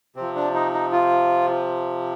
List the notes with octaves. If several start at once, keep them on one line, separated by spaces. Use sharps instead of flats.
C3 F3 C4
D4
D#4
D#4
F4